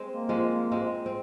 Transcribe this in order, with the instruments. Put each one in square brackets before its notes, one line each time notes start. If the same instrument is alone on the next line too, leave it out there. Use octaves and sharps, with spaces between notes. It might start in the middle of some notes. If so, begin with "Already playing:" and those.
Already playing: [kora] G#3 C4
[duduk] A#3
[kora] F3 G#3
G#3 C4
C4